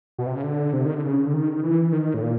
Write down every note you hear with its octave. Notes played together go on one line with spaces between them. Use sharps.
B2
C3
C#3
D3
C3
D#3
D3
C#3
D3
D#3
E3
D#3
A2
A#2